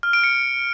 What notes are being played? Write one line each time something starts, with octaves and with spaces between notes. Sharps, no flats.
F6
D7
C#7